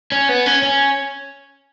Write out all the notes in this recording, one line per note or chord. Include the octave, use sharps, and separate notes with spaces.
C#4
B3
C#4
C#4